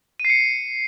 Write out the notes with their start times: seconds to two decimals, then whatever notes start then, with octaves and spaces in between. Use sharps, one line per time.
0.20 D#7
0.25 C7
0.30 C#7